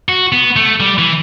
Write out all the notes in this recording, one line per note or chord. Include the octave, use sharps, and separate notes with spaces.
F#4
B3
A3
G3
E3